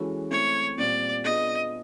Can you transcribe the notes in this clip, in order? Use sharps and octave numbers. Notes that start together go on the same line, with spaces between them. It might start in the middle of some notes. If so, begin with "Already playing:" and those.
Already playing: E3 G#3 C#4 F#4 A4
A3 C4 E4 C#5
A#2 G3 C4 F4 D5
B3 D4 F4 G#4 B4 D#5